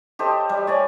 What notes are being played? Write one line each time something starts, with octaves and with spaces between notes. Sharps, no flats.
G4 A4 C5 D#5
G3
C#5 D5 G#5